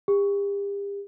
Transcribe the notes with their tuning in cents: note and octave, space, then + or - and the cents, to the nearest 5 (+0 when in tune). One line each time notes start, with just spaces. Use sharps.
G4 +40